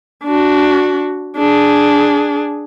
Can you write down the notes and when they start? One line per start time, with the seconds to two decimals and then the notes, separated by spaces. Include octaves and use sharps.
0.24 D4 F#4
1.37 D4 G#4